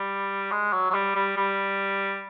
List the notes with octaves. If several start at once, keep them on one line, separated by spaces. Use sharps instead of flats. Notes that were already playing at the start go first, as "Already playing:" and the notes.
Already playing: G3
G#3
F#3
F#3
G3
G3
G3